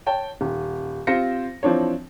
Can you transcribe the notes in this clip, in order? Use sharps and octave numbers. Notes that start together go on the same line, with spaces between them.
C#5 G5 A5
D#1
C4 F4 G4 C5 A#6 C#7
E3 F3 C4 D4 C#5